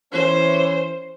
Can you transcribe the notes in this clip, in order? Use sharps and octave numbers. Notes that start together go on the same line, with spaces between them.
E3 C#4 C5